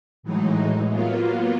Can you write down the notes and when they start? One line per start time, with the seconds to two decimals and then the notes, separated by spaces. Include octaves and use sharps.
0.23 A2 E3 F#3 G#3 D#4
0.90 F#3 A#3 B3 F4